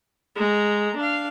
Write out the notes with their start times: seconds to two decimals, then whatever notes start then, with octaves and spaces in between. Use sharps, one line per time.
0.35 G#3 A#5
0.97 D4 F5